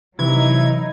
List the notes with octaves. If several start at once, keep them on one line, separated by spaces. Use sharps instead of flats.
C3 E3 F#3 D#4 E4 G#6